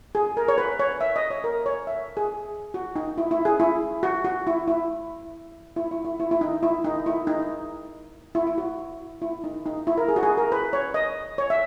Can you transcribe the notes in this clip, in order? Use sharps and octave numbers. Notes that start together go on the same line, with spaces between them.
G#4
A#4
C#5
B4
C#5
E5
D#5
C#5
A#4
C#5
E5
G#4
F#4
D#4
E4
E4
G#4
E4
F#4
F#4
E4
E4
E4
E4
E4
E4
E4
D#4
E4
D#4
E4
D#4
E4
E4
F#4
E4
D#4
D#4
E4
A#4
G#4
F#4
G#4
A#4
B4
C#5
D#5
C#5
E5